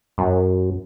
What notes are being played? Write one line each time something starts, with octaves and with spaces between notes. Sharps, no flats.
F#2